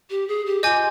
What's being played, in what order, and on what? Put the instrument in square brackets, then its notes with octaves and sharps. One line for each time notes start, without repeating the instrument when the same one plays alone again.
[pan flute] G4
G#4
G4
[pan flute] F4 [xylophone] D#5 G#5 D6 G6